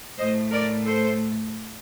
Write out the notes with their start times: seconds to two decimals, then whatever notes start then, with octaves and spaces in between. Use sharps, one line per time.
0.17 A2 A3 C5 D#5
0.51 A#4 D5
0.85 A4 C5